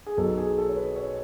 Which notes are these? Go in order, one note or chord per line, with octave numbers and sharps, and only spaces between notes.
G#4
B1 B2 F#3 B3 A4
G#4
A4
C#5
B4
C#5